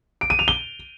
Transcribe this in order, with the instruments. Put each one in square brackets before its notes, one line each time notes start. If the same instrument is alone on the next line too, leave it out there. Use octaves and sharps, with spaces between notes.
[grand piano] D7
D#7
F7
G7